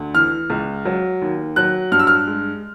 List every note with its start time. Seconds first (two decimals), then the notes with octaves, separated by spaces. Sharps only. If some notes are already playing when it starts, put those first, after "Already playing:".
Already playing: D2
0.14 E3 F6
0.50 C#2
0.85 F#3
1.22 D#2
1.56 F#3 F#6
1.92 G2 F6
1.99 E6
2.07 F6
2.27 G#3